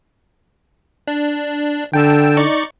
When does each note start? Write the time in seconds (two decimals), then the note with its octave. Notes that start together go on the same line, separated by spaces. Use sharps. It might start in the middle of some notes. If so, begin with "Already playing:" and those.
1.08 D4
1.93 D3 G5 A5 E6
2.37 D#4 D5 C#6